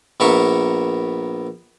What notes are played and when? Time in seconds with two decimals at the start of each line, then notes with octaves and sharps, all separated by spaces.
0.20 A#1 B3 A#4 E5 C#6